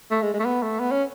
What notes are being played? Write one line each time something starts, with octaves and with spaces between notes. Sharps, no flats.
A3
G#3
G#3
A3
B3
A3
B3
C#4